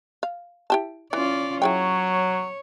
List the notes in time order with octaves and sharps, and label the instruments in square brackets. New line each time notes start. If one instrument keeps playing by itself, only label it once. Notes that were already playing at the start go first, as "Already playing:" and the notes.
[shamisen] F5
E4 G4 A5
[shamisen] E3 [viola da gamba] C#4 F4 D5
[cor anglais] F#3 [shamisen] E4 G#4 G5 [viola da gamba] C#5